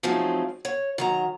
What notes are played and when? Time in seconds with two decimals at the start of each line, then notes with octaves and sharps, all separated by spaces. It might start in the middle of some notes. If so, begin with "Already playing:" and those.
0.03 F3 F#3 G#3 A3 C4 D#4
0.65 C#5
0.98 D#3 F#3 A#5